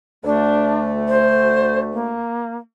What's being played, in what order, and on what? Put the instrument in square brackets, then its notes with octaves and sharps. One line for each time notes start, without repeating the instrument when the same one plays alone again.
[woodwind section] D2 A3 [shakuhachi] D4
[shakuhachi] C5
A#3